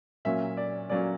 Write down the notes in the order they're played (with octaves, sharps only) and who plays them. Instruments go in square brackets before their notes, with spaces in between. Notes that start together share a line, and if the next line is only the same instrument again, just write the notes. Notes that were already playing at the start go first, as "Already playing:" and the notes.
[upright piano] A#2 F#3 A#3 C#4 E5
D5
A#2 F#3 A#3 C#4 D5